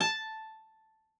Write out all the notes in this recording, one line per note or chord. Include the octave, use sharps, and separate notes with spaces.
A5